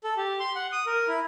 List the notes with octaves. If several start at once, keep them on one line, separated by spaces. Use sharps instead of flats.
A4
G4
C6
F#5
D#6
A#4
E4